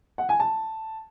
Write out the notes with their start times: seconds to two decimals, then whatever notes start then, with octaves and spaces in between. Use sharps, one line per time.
0.18 F#5
0.29 G#5
0.40 A5